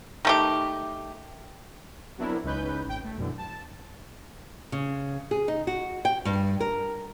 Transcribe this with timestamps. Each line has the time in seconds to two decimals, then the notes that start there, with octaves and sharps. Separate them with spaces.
0.25 D#3 A3 G4
2.18 F#3 B3 C4 D4 E4 A#4
2.43 C#2 C#4 D#4 B4 G6
2.85 G#1 G5
3.04 A3
3.17 F#2 B2 D3 E3
3.38 A5
4.72 C#3
5.31 G#4
5.48 D#4
5.67 F#4
6.05 G5
6.25 G2
6.60 A#4